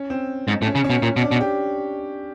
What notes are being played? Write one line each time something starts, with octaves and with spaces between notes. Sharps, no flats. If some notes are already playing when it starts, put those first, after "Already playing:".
Already playing: C#4
C4
G#2
A2
C#4
C#3
C#4
B2
A#2 C#4
B2
D4
B2
G4